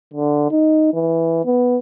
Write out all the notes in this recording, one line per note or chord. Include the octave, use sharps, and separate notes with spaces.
D3
D#4
E3
B3